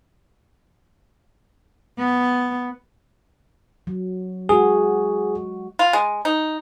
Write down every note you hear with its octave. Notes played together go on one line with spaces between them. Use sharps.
B3
F#3
G#3 F#4 G#4
F4
G#3
D#4